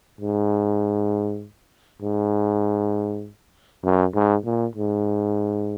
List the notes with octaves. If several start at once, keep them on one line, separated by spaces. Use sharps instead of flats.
G#2
G#2
F#2
G#2
A#2
G#2